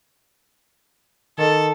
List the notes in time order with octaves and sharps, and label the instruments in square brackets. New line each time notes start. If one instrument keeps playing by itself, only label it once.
[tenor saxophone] D#3 [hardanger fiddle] A4